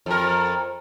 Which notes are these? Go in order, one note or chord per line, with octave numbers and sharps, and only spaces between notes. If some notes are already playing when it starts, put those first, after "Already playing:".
F2 A#4